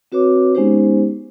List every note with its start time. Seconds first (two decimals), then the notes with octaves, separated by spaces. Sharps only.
0.12 C4 F#4 B4 C#5 D6
0.55 G#3 B3 C#4 D#4 G4 C5